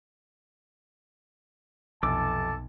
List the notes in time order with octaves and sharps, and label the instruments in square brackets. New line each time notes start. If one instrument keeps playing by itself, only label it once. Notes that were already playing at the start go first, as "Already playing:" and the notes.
[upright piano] F1 [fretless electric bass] B1 [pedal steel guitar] A4 D6 [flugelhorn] A5